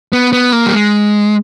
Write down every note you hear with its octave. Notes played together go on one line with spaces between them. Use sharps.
B3
B3
A#3
G3
G#3